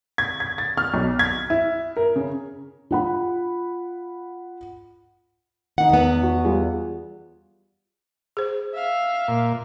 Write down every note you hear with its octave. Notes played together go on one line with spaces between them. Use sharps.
G#6
G#6
A6
F6
B1
G#6
E4
A#4
C#3
F4 F#5 B5
D#3 D#4 F#5
E2 B3
F#4
G3 F4 G#4
G#4 C5
E5 F5
A#2